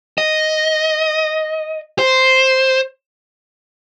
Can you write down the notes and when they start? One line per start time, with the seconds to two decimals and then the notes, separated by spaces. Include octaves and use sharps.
0.18 D#5
1.99 C5